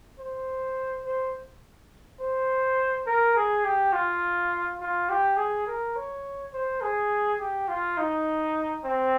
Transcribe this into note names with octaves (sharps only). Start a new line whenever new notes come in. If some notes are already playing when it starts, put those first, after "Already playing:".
C5
C5
C5
A#4
G#4
G4
F4
F4
G4
G#4
A#4
C#5
C5
G#4
G4
F4
D#4
C4